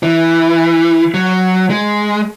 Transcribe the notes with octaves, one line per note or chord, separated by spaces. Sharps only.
E3
F#3
G#3